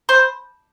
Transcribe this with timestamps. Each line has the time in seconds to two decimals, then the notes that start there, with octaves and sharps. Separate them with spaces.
0.09 C5